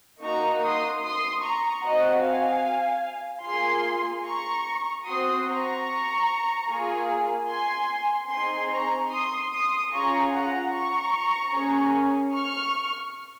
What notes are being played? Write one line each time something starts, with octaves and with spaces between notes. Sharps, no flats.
A#3 D#4 F#4 A#5 C#6
C6 D#6
C6 D#6
A#5 C#6
C4 F#4 D#5 F#5
F5 G#5
A#3 F4 G#4 G#5 C6
A#5 C#6
C4 F#4 C6 D#6
A#5 C#6
A#3 F4 G#4
G#5 C6
C4 D#4 G#4 G#5 C6
A#5 C#6
C6 D#6
C6 D#6
C#4 F4 G#4 A#5 C#6
F#5 A#5
A#5 C#6
A#3 C#4 G#4
C#6 F6